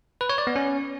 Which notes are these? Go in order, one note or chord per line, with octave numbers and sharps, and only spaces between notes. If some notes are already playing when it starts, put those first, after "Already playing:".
B4
C#5
D5
B3
C#4